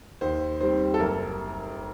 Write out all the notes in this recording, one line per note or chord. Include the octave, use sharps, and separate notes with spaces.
D#2 C5
D#3 G3 C4 C5
A4
F#1 A#4